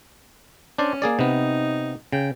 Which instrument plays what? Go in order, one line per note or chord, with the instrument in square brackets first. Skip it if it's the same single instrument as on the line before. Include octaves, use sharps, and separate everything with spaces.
[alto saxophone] C#4 [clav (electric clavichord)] D4 C5 D5
[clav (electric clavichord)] A#3 G#4 D5
[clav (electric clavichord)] C3 B3 [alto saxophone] D#4
[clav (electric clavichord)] C#3 [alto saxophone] G5